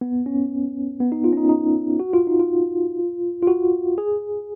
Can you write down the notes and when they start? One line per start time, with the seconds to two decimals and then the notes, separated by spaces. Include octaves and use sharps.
0.01 B3
0.26 C#4
1.00 B3
1.12 D#4
1.24 F4
1.33 C#4
1.37 D#4
1.49 D#4
2.00 F#4
2.13 F4
2.27 D#4
2.40 F4
3.42 F4
3.47 F#4
3.98 G#4